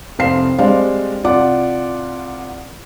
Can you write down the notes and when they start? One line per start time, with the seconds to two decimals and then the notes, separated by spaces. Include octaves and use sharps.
0.19 F1 C2 C4 F5 C7 E7
0.58 G3 G#3 C4 D4 C5 F5
1.24 C2 F4 D5 F#5 D6